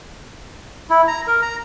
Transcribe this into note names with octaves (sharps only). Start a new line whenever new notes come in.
E4
A#5
A#4
A#5